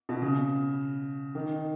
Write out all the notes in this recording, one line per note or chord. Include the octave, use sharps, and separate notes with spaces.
B2
C#3
D#3